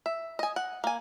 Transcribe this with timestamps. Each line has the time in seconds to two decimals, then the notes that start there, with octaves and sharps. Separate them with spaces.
0.06 E5
0.39 D#5 G#5
0.56 F#5
0.84 A#3 G#5